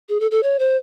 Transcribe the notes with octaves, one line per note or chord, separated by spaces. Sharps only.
G#4
A4
A4
C#5
C5